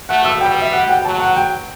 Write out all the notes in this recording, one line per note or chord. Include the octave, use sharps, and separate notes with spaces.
A3 F#5
E6
G3 G5
E5
F#5
F#5
G5
F#3 A5
F#5
G5